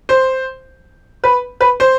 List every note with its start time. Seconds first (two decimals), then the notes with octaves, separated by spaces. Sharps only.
0.09 C5
1.24 B4
1.61 B4
1.80 C5